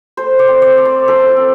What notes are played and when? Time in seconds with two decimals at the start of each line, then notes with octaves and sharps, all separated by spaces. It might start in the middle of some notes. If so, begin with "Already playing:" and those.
0.17 A3 C5
0.39 D5
0.48 C4
0.62 D5
0.77 A3
0.85 C5
1.08 F3 A4
1.37 C4